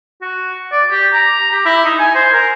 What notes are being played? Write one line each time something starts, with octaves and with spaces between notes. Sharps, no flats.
F#4
D5
G4
A#5
G4
E4
D#4
G#5
C5
A#4